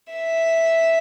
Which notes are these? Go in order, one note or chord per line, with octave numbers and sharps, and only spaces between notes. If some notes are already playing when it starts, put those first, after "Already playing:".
E5